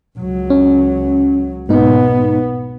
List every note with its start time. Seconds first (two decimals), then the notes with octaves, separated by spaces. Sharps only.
0.18 C#2 F#3
0.50 C#4
1.69 B1 G#2 B3 D#4